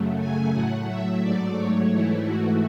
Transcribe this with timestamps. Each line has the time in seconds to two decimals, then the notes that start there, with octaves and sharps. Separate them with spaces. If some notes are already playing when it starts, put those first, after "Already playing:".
Already playing: F#2 C#3 F#3 A3
0.19 G#5
0.53 A2 F#3 A3 F#5
0.88 E5
1.22 G#2 F#3 A3 D5
1.57 C#5
1.91 G#2 E3 A3 E4
2.26 F#4